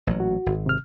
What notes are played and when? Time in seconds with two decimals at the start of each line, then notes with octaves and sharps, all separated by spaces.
0.07 A1 A#2 F#3
0.20 F#4
0.46 G#1
0.66 C3 F6